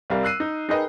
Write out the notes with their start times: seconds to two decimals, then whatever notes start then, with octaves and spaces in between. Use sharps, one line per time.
0.10 C2 G3 A#4 F5
0.23 E6 F#6 C7 D#7
0.40 D#4
0.69 D#4 G#4 A#4 B4 D#5 G5